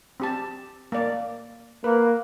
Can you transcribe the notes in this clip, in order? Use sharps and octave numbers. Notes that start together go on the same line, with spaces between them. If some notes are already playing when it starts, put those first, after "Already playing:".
C4 G4 A5
A#3 D5
A#3 B4